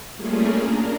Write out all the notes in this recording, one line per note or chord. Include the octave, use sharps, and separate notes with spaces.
G3 A3 A#3 C#4 F4 G#4
D4 A#4